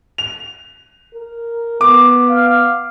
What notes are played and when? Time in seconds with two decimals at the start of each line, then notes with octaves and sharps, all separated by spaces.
0.18 F7
1.14 A#4
1.81 B3 D6
2.29 F5